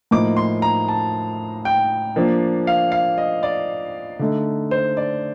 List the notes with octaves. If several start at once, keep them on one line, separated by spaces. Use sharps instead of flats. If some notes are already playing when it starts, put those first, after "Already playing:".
A2 F3 A#3 D#4 D6
C6
A#5
A5
G5
F3 A#3 D4
F5
F5
D#5
D5
D3 A3 D#4
C5
D5